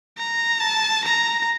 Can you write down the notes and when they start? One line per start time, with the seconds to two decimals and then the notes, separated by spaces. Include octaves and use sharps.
0.18 A#5
0.61 A5
1.05 A#5